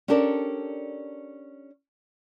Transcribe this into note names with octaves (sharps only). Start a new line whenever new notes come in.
C#4 D4 G4 A4 A#4 D5